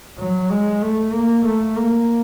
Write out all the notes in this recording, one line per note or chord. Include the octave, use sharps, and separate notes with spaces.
F#3
G#3
A3
A#3
A3
A#3